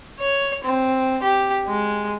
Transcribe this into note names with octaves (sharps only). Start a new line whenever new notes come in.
C#5
C4
G4
G#3